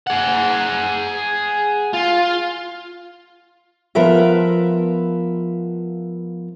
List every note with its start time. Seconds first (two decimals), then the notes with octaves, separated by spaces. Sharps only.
0.07 G#4 F#5
1.93 F4
3.95 F3 B3 F4 A#4 B4 E5